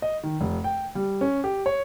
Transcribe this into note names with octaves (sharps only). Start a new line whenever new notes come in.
D#5
D#3
F1
G5
G3
C#4
G4
C#5